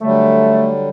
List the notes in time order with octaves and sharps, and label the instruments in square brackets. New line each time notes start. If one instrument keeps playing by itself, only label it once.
[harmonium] D3 F#3 G3 [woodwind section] A3